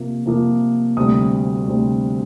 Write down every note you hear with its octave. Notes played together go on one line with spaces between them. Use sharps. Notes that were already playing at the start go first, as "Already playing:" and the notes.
Already playing: C3 F3 A#3
C3 F3 A#3
D2 C3 G3 C4 D#6
D2 C3 G3 C4